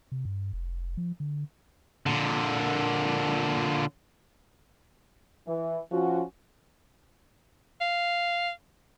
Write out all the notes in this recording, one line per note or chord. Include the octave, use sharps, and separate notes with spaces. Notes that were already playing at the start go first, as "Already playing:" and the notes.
C3
G2
F1
F3
D3
A#2 D3
E3
F3 C#4 F4 F#4
F5